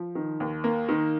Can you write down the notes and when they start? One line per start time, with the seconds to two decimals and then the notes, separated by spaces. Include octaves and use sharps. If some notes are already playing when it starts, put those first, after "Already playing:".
Already playing: F3
0.15 D#3
0.40 D#2
0.64 A#3
0.89 D#3